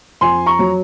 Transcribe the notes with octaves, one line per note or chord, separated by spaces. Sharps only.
F2 G#5 C6
A#5 C#6
F#3